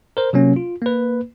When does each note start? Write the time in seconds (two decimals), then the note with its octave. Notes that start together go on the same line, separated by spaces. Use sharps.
0.17 A#4 C5
0.33 C3 F#3 A#3 C#4
0.56 F4
0.82 A#3 B4